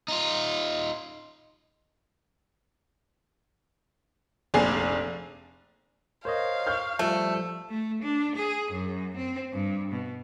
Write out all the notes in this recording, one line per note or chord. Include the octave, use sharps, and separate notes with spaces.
D#4 F4
F1 A#1 G#4 D5 G#5 C7
A#4 C5 C#5 D#5 F5
C#6 F6 G6
F3 G3 A3 A4
A3
D4
G#4
F#2
C4
G2
B2